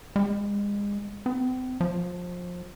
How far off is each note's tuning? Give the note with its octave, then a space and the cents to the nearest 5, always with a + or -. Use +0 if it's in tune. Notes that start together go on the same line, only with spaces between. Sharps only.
G#3 -35
C4 -40
F3 +25